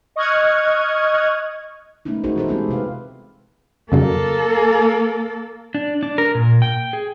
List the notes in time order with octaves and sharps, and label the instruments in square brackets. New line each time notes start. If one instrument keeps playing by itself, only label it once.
[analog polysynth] D#5 C#6 D#6 F6 F#6 G#6
[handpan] G#3 A3 B3 C#4 D#4 E4
D#4 E4 F#4 G#4 A#4 C5
E3 B3 E4 G#4 A4 C5
G#3 B3 C4 F4 G4
C3 B4 F5
[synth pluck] F2 C#3 F#3 [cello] A#3 A4
[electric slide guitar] D4
D4
A#4
A#2
G5
G#4